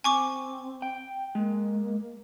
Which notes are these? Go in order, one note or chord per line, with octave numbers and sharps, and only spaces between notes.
C4 G#5 C#6 D6
G5
G#3 A#3